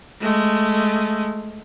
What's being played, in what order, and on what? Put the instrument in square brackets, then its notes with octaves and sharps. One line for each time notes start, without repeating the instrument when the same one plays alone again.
[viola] G#3 A3